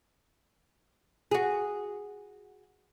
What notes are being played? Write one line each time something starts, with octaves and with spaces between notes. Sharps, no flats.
F#4 G#4